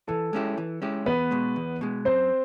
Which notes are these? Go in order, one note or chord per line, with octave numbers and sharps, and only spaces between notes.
E3 A4
G#3 C#4 E4 G4
E3
G#3 C#4 E4 G4
E2 B3 B4
B2 G#3
E2
B2 G#3
F#2 C4 C5